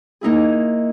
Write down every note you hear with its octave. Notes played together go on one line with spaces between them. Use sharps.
A#3 D#4 E4 G#4